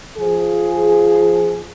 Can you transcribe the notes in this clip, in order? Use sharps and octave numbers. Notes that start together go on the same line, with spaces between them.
F3 G#4